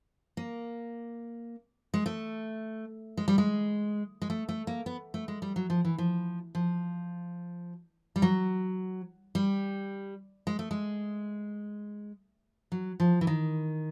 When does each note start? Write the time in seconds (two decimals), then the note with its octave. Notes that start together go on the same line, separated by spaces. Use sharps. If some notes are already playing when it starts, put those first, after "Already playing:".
0.37 A#3
1.94 G#3
2.06 A3
3.17 G#3
3.28 G3
3.38 G#3
4.22 G#3
4.30 A3
4.49 A3
4.67 A#3
4.86 B3
5.14 A3
5.28 G#3
5.42 G3
5.56 F#3
5.70 F3
5.85 E3
5.98 F3
6.55 F3
8.16 G3
8.22 F#3
9.35 G3
10.47 G#3
10.59 A3
10.71 G#3
12.72 F#3
13.00 F3
13.21 E3
13.27 D#3